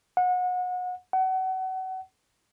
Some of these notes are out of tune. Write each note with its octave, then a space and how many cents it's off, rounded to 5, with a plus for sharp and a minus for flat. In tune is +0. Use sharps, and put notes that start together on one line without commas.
F#5 -30
F#5 +30